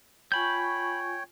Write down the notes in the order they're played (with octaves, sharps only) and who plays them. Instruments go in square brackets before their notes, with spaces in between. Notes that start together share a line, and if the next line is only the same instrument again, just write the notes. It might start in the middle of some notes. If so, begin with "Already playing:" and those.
[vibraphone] F4 G#5 C#6 [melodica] C#5 G5 [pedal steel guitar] B5 G6